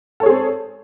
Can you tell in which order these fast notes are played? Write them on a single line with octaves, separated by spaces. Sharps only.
A4 C#5 G#4 C4